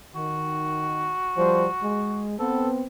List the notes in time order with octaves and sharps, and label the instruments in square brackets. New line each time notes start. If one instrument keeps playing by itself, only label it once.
[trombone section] D#3 [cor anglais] F#4
[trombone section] F3 G3 C5
G#3
[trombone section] B3 C4 [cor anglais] A4